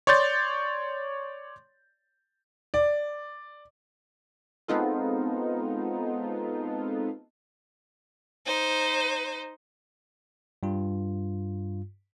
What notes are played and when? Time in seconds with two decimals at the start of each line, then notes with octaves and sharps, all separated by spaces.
0.07 C#5 D5 C6 G6 A6
2.74 D5
4.68 G#3 B3 C4 D#4 F4 A4
8.45 D#4 C5
10.63 G2 F4